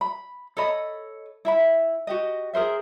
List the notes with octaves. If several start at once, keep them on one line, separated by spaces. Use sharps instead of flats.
B5
A4 C#5 D#5 B5
E4 E5 B5
F#4 G4 D#5
G#4 A#4 C5 E5